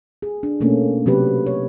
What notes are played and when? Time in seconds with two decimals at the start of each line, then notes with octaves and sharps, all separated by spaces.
0.22 G#4
0.43 D4
0.60 B2 A3 A#3 C#4
1.06 C3 F#3 C4 G4 B4
1.47 C#5